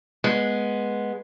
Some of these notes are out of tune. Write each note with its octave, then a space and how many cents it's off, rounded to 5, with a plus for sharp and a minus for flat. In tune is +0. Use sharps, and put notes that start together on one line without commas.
G#3 +0 B3 -15